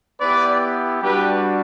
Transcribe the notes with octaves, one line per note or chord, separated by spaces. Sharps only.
B3 E4 G4 B4 D5
G3 D4 F#4 G4 B4